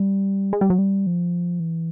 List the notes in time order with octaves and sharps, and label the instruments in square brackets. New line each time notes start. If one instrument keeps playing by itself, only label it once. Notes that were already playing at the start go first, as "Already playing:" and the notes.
Already playing: [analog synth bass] G3
G#3
G3
F#3
G3
F3
E3